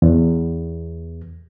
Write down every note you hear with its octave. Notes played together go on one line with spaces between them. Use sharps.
E2